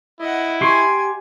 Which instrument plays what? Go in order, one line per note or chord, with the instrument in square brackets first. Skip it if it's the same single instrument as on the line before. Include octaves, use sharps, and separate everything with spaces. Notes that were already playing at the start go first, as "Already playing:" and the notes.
[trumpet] E4 [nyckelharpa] D#5 F#5
[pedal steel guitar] G4 C6 C#6 [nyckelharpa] G#5